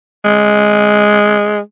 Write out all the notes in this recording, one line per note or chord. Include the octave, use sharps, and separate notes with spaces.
G#3